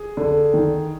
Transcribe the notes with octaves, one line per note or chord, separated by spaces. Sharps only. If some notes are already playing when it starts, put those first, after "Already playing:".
Already playing: G#4
D3
D#3